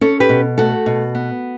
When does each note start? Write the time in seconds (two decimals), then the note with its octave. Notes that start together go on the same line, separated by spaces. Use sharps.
0.01 C#4 A4 C#5
0.20 G4 B4
0.29 B2
0.58 A3 F#4 A4
0.86 B2
1.15 B3